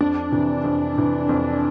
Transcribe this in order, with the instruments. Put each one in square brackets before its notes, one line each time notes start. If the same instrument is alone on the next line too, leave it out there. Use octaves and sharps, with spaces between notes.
[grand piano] F2 [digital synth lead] D4
[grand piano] C3 E3
F2
C3 E3
F2